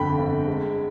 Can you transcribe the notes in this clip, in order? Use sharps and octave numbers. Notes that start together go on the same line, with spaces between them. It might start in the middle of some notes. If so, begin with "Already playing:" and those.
Already playing: G1 F2 D3 G5 B5
G1
G#3